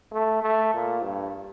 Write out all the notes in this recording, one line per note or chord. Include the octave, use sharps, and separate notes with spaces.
A3
A3
A#2
G2